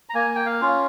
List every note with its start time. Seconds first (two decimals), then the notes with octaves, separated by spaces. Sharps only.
0.09 A#5
0.15 A#3 G#5
0.35 G5
0.46 F5
0.61 C#4 F4